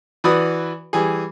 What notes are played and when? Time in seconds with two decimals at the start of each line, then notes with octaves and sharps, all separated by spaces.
0.24 E3 F#4 B4 D5 D#6
0.93 E3 G3 G#4